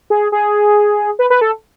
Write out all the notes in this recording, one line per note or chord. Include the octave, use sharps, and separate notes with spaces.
G#4
G#4
B4
B4
A4